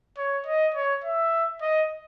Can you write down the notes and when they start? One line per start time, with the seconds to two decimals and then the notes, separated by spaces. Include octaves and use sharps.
0.17 C#5
0.46 D#5
0.74 C#5
1.04 E5
1.61 D#5